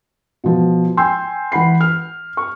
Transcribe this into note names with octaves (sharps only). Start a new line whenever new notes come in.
B2 F3
G5 G#5 C6 E6 G6
E3 F#5 B5 C7
F6
C#6